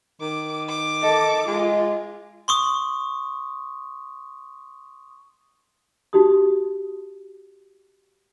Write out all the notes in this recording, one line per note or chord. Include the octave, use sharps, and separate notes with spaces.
D#3 D6
D6
A4 D#5
G#3 F4
C6 C#6 D#6
D#4 F#4 G4 D#6